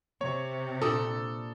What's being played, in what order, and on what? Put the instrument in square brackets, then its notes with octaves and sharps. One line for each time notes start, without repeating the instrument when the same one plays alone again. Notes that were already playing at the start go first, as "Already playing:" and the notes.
[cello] C3 [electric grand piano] C#5
[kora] A#2 D4 [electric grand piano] A4 D#6